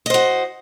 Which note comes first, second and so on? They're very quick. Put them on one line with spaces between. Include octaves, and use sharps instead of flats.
D#5 C5 F#4